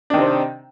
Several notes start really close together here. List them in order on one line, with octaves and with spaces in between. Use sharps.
D4 D#3 C3 C4